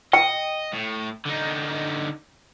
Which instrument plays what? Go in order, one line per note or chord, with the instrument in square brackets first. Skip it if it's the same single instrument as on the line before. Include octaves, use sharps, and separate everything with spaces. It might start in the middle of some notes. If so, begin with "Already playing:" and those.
[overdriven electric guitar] D#5 [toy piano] G5
[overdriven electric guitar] A2
D3 D#4